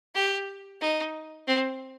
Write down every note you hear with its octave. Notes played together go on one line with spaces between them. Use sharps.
G4
D#4
C4